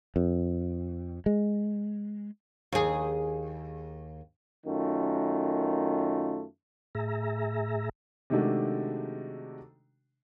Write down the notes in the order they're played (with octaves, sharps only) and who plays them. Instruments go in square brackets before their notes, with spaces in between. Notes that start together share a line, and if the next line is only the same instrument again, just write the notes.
[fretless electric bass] F2
G#3
[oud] D#2 G#4
[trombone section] F#2 D#3 A3 F4
[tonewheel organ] A2 G#4 E5 A#5
[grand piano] C3 D#3 G#3 A3 D4 F#4